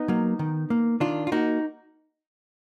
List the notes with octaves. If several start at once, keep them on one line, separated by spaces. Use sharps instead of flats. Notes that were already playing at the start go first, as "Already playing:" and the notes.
Already playing: B3 D#4
F#3 A#3
D#3
A#3
D#3 D4 F4
F4
A#3 D#4 F#4